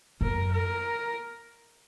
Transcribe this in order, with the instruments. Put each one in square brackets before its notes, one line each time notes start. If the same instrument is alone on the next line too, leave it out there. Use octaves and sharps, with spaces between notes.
[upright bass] F#2 [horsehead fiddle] A#4
[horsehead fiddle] A#4